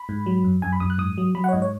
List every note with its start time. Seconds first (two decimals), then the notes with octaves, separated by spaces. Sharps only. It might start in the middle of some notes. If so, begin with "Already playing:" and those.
Already playing: B5
0.09 G#2
0.26 F#3
0.44 F#2
0.62 F#2 G#5
0.73 B5
0.80 F#2 D#6
0.90 F#6
0.98 G#2 D#6
1.18 F#3
1.35 F#3 B5
1.44 F#5
1.49 C#5
1.53 G#2 D#5
1.62 C#5